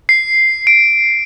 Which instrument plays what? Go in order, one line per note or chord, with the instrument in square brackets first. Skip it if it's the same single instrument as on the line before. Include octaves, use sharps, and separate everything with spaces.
[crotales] C7
D7